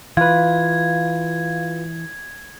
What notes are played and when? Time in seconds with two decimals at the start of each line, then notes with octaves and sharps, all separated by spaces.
0.17 E3 F4 B4 F5 G#6